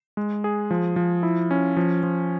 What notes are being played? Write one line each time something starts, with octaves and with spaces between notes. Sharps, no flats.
G#3
G#4
F3
F3
E4
C#4
F3
F3